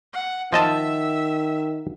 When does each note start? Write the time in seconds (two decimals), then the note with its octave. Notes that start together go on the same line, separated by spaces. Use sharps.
0.13 F#5
0.53 D#3 F3 D#5 E5 A5